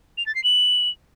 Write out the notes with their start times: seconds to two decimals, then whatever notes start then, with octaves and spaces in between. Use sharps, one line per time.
0.17 F7
0.26 A6
0.35 C7
0.44 F#7